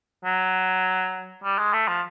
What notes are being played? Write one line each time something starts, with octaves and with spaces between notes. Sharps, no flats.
F#3
G3
G#3
A3
F3